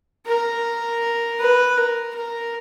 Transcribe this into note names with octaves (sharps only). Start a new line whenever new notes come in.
A#4
B4
A#4
A#4